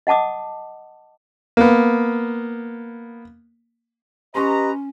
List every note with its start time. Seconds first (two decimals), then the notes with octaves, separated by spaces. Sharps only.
0.07 D#5 F#5 A5 D6 D#6
1.57 A#3 B3
4.35 C#4 G4 B4 D#5 A#5 C6 C#6